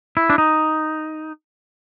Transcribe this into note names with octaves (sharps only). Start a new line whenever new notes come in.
E4
D4
D#4